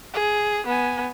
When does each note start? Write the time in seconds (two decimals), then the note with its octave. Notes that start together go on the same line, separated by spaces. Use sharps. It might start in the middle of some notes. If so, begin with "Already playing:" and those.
0.14 G#4
0.66 B3 G#5